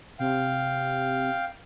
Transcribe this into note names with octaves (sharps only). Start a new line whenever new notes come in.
C3 F5 G5